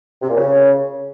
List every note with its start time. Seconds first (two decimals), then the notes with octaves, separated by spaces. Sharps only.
0.22 C3
0.30 A#2
0.37 C#3